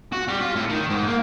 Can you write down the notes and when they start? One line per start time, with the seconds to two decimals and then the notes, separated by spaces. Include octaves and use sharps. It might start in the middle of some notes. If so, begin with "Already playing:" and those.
0.13 F#4
0.28 G3
0.42 F4
0.56 A2
0.69 D#3
0.90 G#2
1.07 A#3